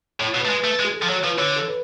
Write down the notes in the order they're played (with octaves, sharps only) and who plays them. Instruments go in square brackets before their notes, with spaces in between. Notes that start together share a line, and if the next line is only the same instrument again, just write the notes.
[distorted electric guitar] A2 [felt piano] C#5
[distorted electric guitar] B2
[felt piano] B4
[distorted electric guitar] A3
G#3
[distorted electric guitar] A3 [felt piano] B4
[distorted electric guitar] G#3
[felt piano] G#4
A4
[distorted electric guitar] F3
[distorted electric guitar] F#3 [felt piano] C#5
[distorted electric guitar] F3 [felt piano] B4
[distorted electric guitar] D3 [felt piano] C#5
[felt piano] A4
B4